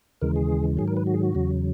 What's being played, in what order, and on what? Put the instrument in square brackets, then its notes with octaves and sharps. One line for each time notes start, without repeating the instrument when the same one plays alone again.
[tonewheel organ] D#2 C#3 E3 G#3 A#4
G#4
G#2 D#3 F#3 G#4
A#4
B4
F#4
G#4
F#4
E2 C#3 F#3